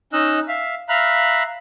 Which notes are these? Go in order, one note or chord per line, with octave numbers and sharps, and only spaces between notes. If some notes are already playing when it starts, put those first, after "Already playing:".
C#4 D#4 D#5 E6 F#6
E5 F5
E5 F5 A#5 B5 F6 F#6